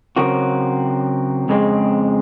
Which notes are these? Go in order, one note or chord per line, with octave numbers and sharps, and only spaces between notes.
C#3 F#3 C4 F#4 A#4
F2 C#3 G#3 C4